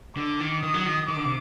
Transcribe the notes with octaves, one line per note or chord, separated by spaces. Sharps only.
D3 D6
D#3
D#3 D#6
F#3
D#3
D#3 D6
D3
C3